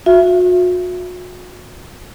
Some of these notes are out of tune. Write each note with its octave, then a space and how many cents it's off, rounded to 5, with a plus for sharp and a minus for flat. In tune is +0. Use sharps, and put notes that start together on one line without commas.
F#4 -40 E5 +25